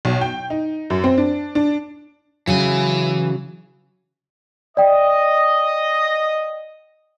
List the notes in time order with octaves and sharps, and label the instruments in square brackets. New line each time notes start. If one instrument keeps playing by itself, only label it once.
[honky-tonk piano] B1
G5
D#4
F#2
C4
D4
D4
[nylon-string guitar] C#3 F#3 [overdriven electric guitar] E3 G#5
[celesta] D5 G5 [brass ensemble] D#5